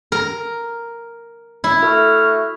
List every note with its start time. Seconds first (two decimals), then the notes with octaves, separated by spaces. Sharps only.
0.12 A#4
1.64 E4
1.82 A3 F#4 F6